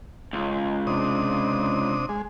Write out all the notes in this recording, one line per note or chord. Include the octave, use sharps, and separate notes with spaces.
C#2
C3 D4 D#6
G#3